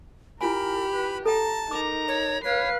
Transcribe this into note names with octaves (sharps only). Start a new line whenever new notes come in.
E4 F4 G4 A#4 G#5 B5
B4
A4 G5 A5 A#5
D#4 A#4 A#5 D6
C#5
B4 C#5 F5 C7